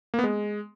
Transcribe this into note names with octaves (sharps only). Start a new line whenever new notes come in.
A#3
B3
G#3